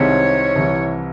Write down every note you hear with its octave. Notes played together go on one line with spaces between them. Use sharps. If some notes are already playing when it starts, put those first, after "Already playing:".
Already playing: C2 C3 D#3 G#3 C4 C#5
C2 C3 E3